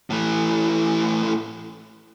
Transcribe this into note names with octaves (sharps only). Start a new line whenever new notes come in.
A2 E3